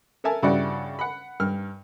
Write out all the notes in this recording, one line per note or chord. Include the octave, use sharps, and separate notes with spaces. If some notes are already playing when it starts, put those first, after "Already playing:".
A4 A#4 E5 G#5 A5
G2 C#3 E4 F#4 D5 F#5
F#5 B5
G2 F6